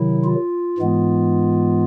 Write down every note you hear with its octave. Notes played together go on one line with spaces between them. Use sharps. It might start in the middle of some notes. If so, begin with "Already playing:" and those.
Already playing: C3 D#3 F#3 E4
F4
G#2 E3 G#3 B3